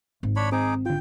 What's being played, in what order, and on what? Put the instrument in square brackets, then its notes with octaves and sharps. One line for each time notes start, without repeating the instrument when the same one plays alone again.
[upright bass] G#1
[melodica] D4 C#5 B5
[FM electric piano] C4 [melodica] D#4 G#4 D6
[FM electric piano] D3 F4 [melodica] G5